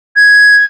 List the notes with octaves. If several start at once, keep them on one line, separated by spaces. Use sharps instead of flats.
G#6